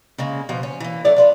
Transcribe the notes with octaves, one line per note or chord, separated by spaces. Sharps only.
C#3 G#3 A#3
B2 F3 C5
C#4
E3 A#3
F#3 A3 C#4 D5
D4 F4 B4